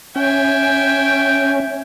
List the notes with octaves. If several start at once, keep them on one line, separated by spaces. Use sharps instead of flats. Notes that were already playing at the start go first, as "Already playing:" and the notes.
C#4 E5 G5 G#5